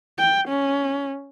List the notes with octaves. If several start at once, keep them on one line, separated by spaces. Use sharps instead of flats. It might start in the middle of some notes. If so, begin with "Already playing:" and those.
G5
C#4